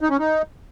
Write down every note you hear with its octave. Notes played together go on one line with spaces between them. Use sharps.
D#4
C#4
D#4